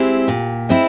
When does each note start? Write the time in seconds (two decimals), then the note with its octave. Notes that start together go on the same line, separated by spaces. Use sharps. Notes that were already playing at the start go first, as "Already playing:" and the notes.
Already playing: G#3 C4 E4 G4
0.28 A#2
0.69 G#3 C4 E4